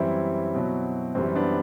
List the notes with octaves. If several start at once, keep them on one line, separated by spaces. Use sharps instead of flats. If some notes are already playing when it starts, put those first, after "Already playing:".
Already playing: F#2 E3 G3 C4 E4
B2 F#3
F#2 E3 G3 C4
B3 D4